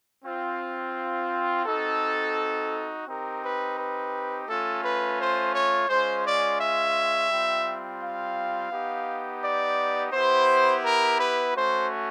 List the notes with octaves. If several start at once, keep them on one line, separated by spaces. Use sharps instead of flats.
C4 F4
C4 D#4 F#4 A4
C4 D#4 G4 A#4
B4
B4
A3 C#4 F4 A4
B4
C5
C#5
G#3 C#4 F4 C5
D5
E5
G3 C4 F4
F5
B3 D#4 G4
D5
B3 E4 G4 C5
A#4
B4
A3 C#4 F#4 C5